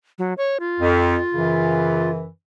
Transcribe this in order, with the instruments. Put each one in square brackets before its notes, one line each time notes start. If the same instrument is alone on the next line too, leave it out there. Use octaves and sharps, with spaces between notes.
[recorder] F#3
C#5
F4
[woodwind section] F2
F#2 C#3 E3